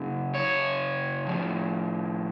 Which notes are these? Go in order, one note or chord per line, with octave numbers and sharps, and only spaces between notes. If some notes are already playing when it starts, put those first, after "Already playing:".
Already playing: F#2 C#3
C#5
A2 F3